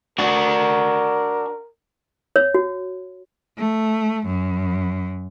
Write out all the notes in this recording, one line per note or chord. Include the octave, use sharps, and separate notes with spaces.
D4 F#4 A#4
C#5
F#4
A3
F#2